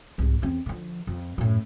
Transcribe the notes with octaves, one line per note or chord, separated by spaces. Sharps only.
C2 G#2
E2 C4
D3 F3
F2
F#2 A2